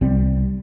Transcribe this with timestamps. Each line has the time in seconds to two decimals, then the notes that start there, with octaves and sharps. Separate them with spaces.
0.01 C2 C3 G3 C4